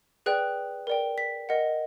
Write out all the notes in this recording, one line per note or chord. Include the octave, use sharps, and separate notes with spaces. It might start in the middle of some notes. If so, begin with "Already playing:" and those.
G#4 B4 D5 G5 F#6
A#4 D5 G5
B6
A#4 D#5 F#5